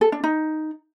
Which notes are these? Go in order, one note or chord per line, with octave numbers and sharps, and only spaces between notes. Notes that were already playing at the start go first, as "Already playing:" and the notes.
A4
D4
D#4